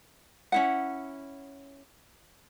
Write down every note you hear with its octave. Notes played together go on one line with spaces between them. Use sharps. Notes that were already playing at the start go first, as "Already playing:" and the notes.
C#4 E4 F#5